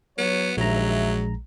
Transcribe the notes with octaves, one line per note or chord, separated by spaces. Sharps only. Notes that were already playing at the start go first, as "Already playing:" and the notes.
F#3 B3 C#5
A#1 D#2 F#3 G#3 E5 A#5